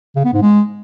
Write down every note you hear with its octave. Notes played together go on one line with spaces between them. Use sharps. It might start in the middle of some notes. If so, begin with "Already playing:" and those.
C#3
B3
G#2
G#3